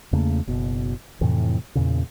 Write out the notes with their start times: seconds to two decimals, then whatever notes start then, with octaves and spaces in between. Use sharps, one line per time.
0.13 E2 C#3 A3 A#3
0.47 F#1 B2
1.21 F2 A2 C3 E3
1.75 E2 A#2 C#3